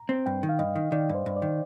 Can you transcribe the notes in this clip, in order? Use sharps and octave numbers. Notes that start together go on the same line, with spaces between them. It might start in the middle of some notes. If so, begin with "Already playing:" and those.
Already playing: A#5
C4
G2 G5
D#3
F5
G2 D#5
D#3
D#3 D5
G2
C5
G2
D5
D#3